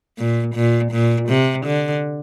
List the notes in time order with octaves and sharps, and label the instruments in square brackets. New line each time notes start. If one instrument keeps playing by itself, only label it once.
[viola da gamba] A#2
A#2
A#2
C3
D3